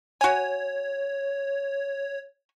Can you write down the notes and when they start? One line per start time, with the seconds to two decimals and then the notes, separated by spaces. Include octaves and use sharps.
0.21 F#4 C#5 G#5